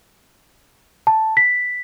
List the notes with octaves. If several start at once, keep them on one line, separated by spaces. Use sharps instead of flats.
A5
B6